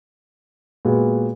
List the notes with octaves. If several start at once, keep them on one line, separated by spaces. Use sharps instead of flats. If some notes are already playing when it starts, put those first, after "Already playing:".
A#2 G#3 B3 F#4